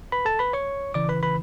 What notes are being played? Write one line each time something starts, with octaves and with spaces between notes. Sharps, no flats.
B4 B5
A4 A5
B4 B5
C#5 C#6
C#3 E3 D5 D6
B4 B5
B4 B5